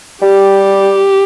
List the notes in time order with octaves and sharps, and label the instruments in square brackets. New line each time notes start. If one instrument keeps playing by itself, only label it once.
[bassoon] G3 [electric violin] G4